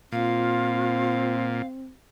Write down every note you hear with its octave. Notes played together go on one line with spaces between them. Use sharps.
A#2 C4 F4 F5